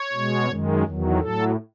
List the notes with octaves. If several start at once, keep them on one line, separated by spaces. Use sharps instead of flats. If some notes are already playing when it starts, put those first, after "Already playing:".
Already playing: C#5
B2 G#3
F#2 D#3 G#3
E2 D#3 F#3
A2 F#3 A4